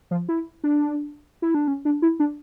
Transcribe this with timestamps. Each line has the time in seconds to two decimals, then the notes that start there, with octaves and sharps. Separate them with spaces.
0.11 F3
0.29 E4
0.64 D4
1.42 E4
1.55 D4
1.68 C#4
1.85 D4
2.02 E4
2.20 D4